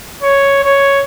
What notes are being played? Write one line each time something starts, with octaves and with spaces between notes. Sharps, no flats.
C#5
C#5